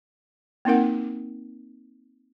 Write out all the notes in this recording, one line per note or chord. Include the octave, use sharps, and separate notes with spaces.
A#3 C4 D#4 A#4 F#5